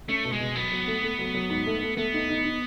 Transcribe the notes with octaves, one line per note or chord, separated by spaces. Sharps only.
A3 C#4
B2
G#3
B2
F#3 B3
F#3
A3
A3
F#3
F#3
G#2
A3
A3
A3 B3
D#4
D#4
D#4